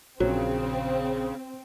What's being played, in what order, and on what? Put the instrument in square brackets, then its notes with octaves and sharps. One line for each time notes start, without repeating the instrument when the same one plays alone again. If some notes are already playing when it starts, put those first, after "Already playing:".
[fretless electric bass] A#1 [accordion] C#3 [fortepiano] F#3 [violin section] C4